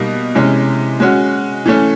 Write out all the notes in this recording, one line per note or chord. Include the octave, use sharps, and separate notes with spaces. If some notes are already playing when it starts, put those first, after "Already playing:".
Already playing: B2 G3 A#3 D#4
C3 E3 G#3 C#4
G#3 C#4 F#4
E3 A3 C#4